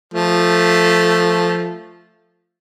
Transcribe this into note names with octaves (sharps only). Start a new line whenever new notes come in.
F3 A3